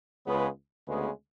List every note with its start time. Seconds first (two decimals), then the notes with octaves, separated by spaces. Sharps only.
0.27 C#2 C#3 G#3 B3
0.87 D2 C#3 G#3 B3